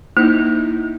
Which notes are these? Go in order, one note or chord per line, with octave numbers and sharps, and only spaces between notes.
A#3 D#4 E4